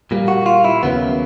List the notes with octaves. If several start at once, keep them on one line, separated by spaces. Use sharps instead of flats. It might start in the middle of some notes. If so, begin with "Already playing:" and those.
A#2 G3 A#3
F#4
F4
E4
D#2 C#3 F#3 A#3 B3